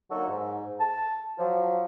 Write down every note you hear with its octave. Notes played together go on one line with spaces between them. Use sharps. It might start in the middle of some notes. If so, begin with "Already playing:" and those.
D3 F#3 A#3 D#4 F#4 A4
G#2
A5
F3 F#3